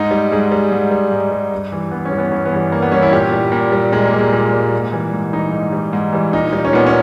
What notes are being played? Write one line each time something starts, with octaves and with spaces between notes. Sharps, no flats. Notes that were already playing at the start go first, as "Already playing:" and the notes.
Already playing: G#2 D#4
G3
G#2 G#3
G3
G#2
G3
G#2
G3
G2
E3 G3
G2 B3
C#4
E3 G3
B3
G2 C#4
B3
E3 G3
G2 A#3
B3
E3 G3 C#4
E4
A#2 G4
G3
A#2
G3
A#2 G#3
A#3
G3
G#3
A#2 A#3
G3
G#2
E3 G3
G#2
E3 G3 D#4
G#2
E3 G3
G#2
E3 G3
A#2 D#4
G3 D#4
C#4
A#2 B3
C#4